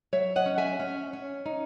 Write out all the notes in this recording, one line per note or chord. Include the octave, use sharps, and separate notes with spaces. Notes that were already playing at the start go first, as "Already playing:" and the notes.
F#3 C#5 E5
D#5 F#5
C#4
E5 G#5
C#4
C#4
D#4